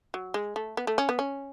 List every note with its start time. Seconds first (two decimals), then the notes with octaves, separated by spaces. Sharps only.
0.14 F#3
0.34 G#3
0.56 A3
0.77 B3
0.87 A3
0.98 C#4
1.09 B3
1.19 C#4